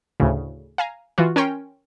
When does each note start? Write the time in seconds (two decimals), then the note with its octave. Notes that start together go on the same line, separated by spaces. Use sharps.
0.20 D2 A2 C#3
0.78 F5 G#5 A#5
1.18 E3 F4 F#4
1.36 C#4 A#4 C#5 G5 C6